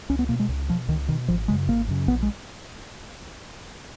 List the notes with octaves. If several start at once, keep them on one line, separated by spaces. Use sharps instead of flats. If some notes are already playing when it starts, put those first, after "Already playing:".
C#2 C#4
B3
B2 A#3
G#3
C#2
B2 F3
C#2 D#3
B2 D#3
G#1 F3
F#2 C#3 G#3
G#1 A#3
F#2 C#3
A#1 B3
G#3